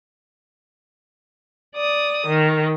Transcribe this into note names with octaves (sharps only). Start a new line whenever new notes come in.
D5 D#6
D#3